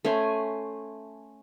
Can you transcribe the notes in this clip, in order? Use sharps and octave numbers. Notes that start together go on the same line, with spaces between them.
A3 C#4 C5 G#5